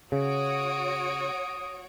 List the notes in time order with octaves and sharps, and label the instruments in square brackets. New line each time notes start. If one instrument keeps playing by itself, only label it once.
[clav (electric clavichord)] C#3 [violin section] F#4 C#5 D7 [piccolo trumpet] D#6